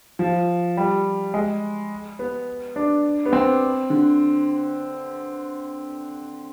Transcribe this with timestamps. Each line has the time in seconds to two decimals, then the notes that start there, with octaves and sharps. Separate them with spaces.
0.19 F3
0.77 G3
1.34 G#3
2.19 B3
2.76 D4
3.26 B3
3.33 C4
3.90 D3